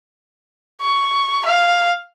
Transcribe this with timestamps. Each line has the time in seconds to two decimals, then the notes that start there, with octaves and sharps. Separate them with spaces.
0.81 C#6
1.46 F5